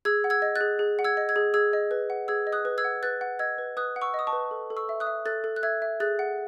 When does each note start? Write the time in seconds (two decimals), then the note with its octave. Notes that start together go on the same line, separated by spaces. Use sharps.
0.05 G#4 E6 G#6
0.24 F#5
0.30 E6 G#6
0.42 D#5
0.56 F#6 A6
0.61 G#4
0.79 G#4
0.99 F#5
1.04 E6 G#6
1.17 D#5
1.29 E6 G#6
1.36 G#4
1.54 G#4 E6 G#6
1.73 D#5
1.91 B4
2.10 F#5
2.28 G#4 E6 G#6
2.47 D#5
2.53 D#6 F#6
2.65 B4
2.78 E6 G#6
2.84 F#5
3.03 B4 F#6 A6
3.21 F#5
3.39 D#5 E6 G#6
3.58 B4
3.77 B4 D#6 F#6
3.96 F#5
4.02 C#6 E6
4.14 D#5
4.19 D#6
4.27 A5 C#6
4.33 B4
4.51 A4
4.70 A4
4.76 C#6 E6
4.89 E5
5.00 D#6 F#6
5.07 E5
5.26 A4 F#6 A6
5.44 A4
5.56 F#6
5.63 E5 E6 G#6
5.82 E5
6.00 G#4 F#6 A6
6.19 F#5